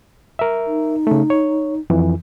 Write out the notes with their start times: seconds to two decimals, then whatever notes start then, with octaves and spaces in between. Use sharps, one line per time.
0.39 A#4 E5
0.67 D#4
1.07 C#3 A3
1.30 C#5
1.90 F2 E3